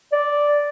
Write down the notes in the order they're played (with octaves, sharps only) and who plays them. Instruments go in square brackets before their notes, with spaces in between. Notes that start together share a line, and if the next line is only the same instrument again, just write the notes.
[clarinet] D5